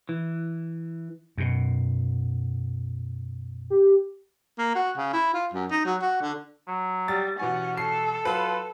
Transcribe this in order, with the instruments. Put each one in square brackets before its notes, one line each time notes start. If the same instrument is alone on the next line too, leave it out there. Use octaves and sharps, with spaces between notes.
[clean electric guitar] E3
[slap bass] F#2 B2
[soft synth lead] G4
[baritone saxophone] A#3
F#4
C#3
E4
F4
F#2
D#4
F#3
F#4
D3
[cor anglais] F#3
[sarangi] G3 [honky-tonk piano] A6
[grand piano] B2 E3 G#5 [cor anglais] C#4 [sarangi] F#5
[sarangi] A4 [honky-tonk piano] C7
[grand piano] F#3 [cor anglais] F4 [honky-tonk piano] B4